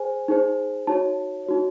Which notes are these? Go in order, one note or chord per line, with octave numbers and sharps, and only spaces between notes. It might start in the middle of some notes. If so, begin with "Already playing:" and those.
Already playing: G#4 C5 G#5
D#4 G#4 C5
D#4 F#4 C#5 A5
D#4 F#4 C#5